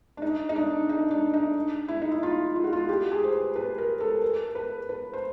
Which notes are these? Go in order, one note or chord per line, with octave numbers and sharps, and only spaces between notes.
D4
D#4
D#4
D4
D#4
D4
D#4
E4
D#4
E4
F4
F4
F#4
F4
G4
G#4
C5
B4
B4
A#4
A4
A#4
B4
B4
C5